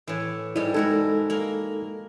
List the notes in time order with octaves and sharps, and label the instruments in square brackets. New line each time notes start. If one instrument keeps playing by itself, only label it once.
[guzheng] A2 E3
[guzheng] G#2 G3 [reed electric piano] E4
[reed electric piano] G#3 D#4 A4 [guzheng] E4 F#4 A#4
[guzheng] A#3 A#4